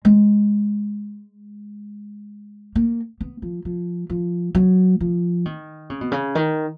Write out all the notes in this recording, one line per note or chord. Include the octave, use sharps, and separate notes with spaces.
G#3
A#3
B3
F3
F3
F3
F#3
F3
D#3
C#3
B2
C#3
D#3